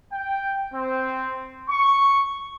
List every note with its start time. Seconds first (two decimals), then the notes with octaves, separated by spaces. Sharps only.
0.11 G5
0.73 C4
1.68 C#6